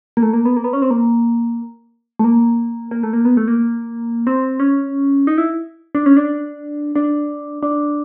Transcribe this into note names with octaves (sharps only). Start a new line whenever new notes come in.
A#3
A3
A#3
B3
A#3
B3
C#4
C4
A#3
A3
A#3
A#3
A3
A#3
B3
A3
A#3
C4
C#4
D#4
E4
D4
C#4
D4
D4
D4